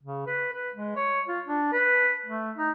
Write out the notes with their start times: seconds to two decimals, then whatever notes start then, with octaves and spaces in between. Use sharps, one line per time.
0.03 C#3
0.27 B4
0.53 B4
0.74 G#3
0.96 C#5
1.28 F4
1.47 D4
1.73 B4
2.26 A3
2.58 D#4